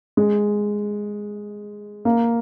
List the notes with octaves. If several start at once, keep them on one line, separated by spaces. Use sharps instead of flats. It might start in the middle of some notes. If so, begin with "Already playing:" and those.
G#3
A#3